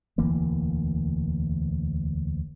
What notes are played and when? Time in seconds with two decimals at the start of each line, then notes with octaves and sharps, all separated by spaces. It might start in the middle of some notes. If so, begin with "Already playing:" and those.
0.18 E1 D2 E3 A#3